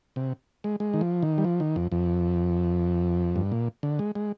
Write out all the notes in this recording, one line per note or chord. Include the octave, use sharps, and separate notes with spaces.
C3
G#3
G#3
D#3
F3
D#3
G3
F3
D#3
F2
F2
G2
A#2
D3
G#3
G#3